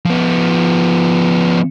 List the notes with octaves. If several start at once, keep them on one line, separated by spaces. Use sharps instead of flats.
F3 B3